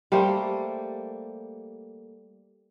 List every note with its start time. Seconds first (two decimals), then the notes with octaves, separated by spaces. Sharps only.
0.12 G3 A3 A#3 C5